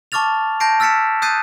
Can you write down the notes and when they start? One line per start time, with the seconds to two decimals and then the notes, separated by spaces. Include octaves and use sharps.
0.12 A5 C#6 D6 F6 A6 F7
0.60 A5 G6 A#6 C7 D7
0.80 E6 F6 A6 B6 C#7 E7
1.22 D#6 F#6 G6 A6 C7 D#7